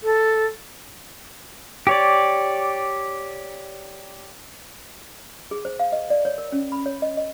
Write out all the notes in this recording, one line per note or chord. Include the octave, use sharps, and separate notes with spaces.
A4
G4 C#5 D5
G#4
C5
F5
D#5
D5
C#5
A#4
C#4
B5
C#5
D#5
D#5